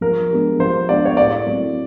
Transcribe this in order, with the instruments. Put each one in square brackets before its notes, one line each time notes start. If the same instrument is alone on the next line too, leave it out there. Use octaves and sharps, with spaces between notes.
[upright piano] F3 [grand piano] A#4
[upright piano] G#3 B3 D4 G4
[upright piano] F3 [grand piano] C5
[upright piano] G#3 B3 D4 G4 [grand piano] D5
[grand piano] C#5
[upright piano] A2 [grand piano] D5
[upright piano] F#3 A3 C4 E4